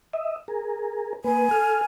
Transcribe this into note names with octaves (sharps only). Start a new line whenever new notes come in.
D#5 E5
G#4 A#4
A#3 B4 G#5
A4 F6